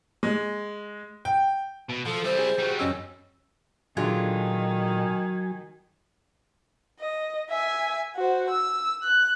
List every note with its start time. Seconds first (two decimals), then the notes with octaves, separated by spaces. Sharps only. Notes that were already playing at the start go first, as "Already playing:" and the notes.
0.23 G#3
1.25 G5
1.90 B2
2.06 F3 A4
2.25 G3 E4 C5
2.39 G#4
2.59 F#3 G3
2.79 F#2 C#4 D#5 E6
3.97 A#2 D3 D#3 F#3 G#3 F4 G#5
7.00 D#5
7.50 E5 G#5
8.16 F#4 C5
8.50 E6
9.03 F#6